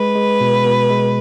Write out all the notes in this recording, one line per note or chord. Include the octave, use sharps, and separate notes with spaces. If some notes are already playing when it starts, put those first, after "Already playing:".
Already playing: G#3 B4
G#3
B2
B2
G#3